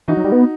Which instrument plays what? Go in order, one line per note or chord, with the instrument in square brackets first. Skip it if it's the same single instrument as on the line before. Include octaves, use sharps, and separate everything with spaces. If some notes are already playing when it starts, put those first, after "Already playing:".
[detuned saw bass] E3 [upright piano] D#4 F#4
[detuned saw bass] F#3
G3
B3